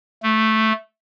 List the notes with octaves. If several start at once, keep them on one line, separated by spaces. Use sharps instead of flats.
A3